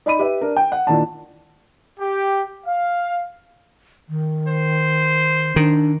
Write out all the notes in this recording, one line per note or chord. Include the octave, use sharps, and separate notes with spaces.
D#4 D5 B5 D#7
G4 B4 E5
D4 A#4
G5
F#5
A#2 D#3 D4 E4 A5
G4
F5
D#3
C5
D#3 D4